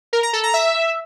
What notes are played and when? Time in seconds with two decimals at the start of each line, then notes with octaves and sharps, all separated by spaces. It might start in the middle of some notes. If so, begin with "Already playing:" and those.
0.13 A#4
0.23 A#5
0.33 A4
0.43 A#5
0.54 E5